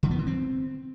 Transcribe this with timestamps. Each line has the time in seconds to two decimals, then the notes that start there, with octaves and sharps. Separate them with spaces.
0.03 D3
0.11 B3
0.19 E3
0.27 C4